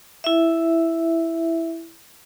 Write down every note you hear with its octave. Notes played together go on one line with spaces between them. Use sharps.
E4 E5